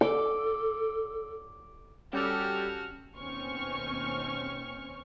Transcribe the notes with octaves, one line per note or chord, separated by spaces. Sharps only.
A4 D6
G3 C#4 F#4 G4 A4 F6
D#2 B2 C4 C#4 C#6 F6